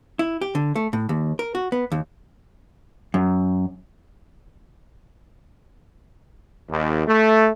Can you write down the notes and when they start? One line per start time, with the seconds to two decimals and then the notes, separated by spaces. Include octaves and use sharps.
0.19 E4
0.41 G4
0.55 D3
0.76 A3
0.93 A2
1.09 D#2
1.39 A#4
1.55 F#4
1.72 B3
1.92 D#2
3.14 F#2
6.70 D#2
7.07 A3